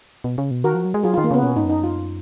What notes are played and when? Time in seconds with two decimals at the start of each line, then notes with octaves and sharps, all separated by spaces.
0.24 B2
0.38 C#3
0.51 B2
0.64 D#3 F#4 A#4
0.75 F3
0.85 F#3
0.94 G#3
1.03 F#3 F4 G#4
1.14 F4
1.18 D#3
1.24 A#3
1.31 C#3 B3
1.43 B2 C#4
1.56 G#2 D#4
1.64 F#2
1.70 D#4
1.84 F4